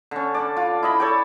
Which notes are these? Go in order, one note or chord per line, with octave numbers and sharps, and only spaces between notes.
D3 C#4
D4 D5
F4
E4 D#5 B5
A4 C#5 D5 G5